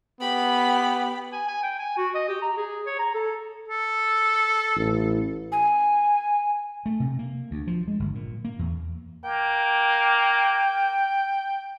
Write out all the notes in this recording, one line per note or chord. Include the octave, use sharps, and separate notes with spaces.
B3 G4 B5
G#5
G#5
G5
G#5
F#4
D#5
G4
A#5
G#4
C#5
A#5
A4
A4
A1
G#5
A3
C3
A#3
D2
F3
G#3
G1
A#2
A#3
E2
A#3 G5